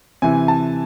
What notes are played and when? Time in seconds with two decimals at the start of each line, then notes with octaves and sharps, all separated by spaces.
0.22 C3 E3 G#5
0.48 A5